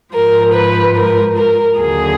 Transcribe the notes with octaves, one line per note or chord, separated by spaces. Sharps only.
G#2 F3 A#4
B4
A#4
A#4
D#2 D3 F#3 G#4